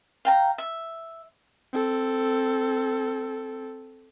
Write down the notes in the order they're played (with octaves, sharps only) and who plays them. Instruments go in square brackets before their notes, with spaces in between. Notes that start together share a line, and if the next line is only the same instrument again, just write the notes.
[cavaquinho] F5 G5 A#5
E5
[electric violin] C4 A4